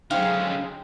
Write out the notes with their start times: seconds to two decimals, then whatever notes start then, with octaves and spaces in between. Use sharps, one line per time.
0.11 D3 F#3 G#3 C#4 D#4 C5 F5 G5